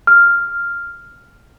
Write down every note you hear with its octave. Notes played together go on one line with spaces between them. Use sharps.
F6